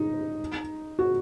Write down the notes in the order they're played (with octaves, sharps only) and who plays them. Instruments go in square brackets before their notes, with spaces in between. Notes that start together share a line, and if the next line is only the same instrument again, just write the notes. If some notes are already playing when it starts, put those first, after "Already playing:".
Already playing: [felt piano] D#4
F#4